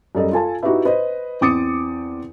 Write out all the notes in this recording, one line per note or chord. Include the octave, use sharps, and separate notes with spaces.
F#2 G3 A4 D#5
F4 A4 G#5 A5
D#4 E4 F#4 G4 B4 E5
B4 C5 D#5
E2 C4 D6 D#6 A6 C#7